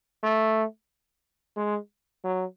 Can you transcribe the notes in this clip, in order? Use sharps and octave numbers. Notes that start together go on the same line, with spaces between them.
A3
G#3
F#3